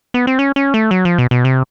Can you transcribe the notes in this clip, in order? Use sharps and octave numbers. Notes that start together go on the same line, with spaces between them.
B3
C4
C#4
C#4
A3
F#3
F3
B2
B2
C3